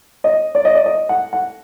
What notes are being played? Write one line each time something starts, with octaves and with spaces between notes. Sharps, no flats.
D#5
D5
D#5
D5
D#5
F#5
F#5